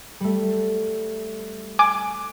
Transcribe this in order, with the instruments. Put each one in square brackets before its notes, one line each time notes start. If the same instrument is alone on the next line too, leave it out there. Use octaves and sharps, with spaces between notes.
[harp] G3 A3
[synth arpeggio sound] G#5 D6 [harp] F#6